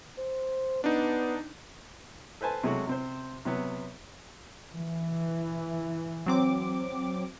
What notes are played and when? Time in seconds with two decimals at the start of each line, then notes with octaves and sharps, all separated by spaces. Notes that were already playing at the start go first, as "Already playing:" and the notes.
0.18 C5
0.84 B3 D4 D#4
2.41 A4 B4 C5 G#5 A5
2.63 C3 F#3 G#3 A3 F#4
2.87 C3 C4 C5
3.45 C3 F#3 B3
4.74 E3
6.26 F#3 C4 D6